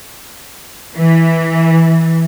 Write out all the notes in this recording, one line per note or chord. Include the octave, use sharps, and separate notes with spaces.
E3